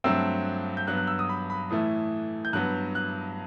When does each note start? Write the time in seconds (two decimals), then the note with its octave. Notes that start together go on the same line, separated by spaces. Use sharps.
0.04 G2 F#3 A3 C4 E6
0.77 G6
0.87 G2 F#3 B3 F#6
0.97 F#6
1.07 E6
1.19 D#6
1.29 B5
1.50 B5
1.70 A2 E3 A3 D#6
2.45 G6
2.53 G2 F#3 B3 F#6
2.95 F#6